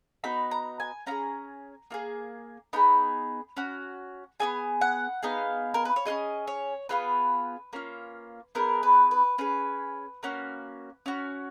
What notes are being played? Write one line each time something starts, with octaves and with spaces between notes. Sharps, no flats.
B3 D#4 F#4 B5
A#5
G#5
C#4 F4 G#4 A#5
A#3 F4 G#4
B3 D#4 G#4 B5
C#4 F#4
B3 D#4 G#4 G#5
F#5
B3 D#4 G#4 F5
A#4
B4
C#5
C#4 F4 G#4 D#5
C#5
B3 F4 G#4 B4
A#3 C#4 F4
B3 D#4 G#4 A#4
B4
B4
C#4 G#4 B4
A#3 C#4 F#4
C#4 F#4